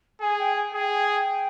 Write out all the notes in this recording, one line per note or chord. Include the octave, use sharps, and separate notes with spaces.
G#4 G#5
G5
G#5
G#4 G5
G5
G5